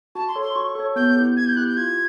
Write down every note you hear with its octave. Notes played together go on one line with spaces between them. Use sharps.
F#4 A5
C6
A4 C#5
C6
F#4 C#6
A4 C#5
B3 G6
E4 G4
B3 G#6
G6
E4 G4 F#6
G6
F4 G#6